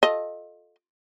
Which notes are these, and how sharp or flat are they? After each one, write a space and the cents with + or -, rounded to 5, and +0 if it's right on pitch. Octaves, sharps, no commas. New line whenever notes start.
F4 +25 A4 -5 D#5 +0